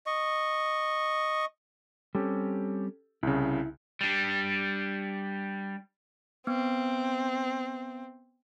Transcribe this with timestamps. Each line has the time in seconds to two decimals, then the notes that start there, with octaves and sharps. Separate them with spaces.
0.06 D#5 C#6
2.15 G3 C4 C#4 G4 A4
3.23 C2 C#3 E4
4.01 G3 D4
6.47 B3 C4